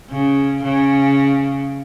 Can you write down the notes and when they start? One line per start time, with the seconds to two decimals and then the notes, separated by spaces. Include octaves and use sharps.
0.11 C#3
0.63 C#3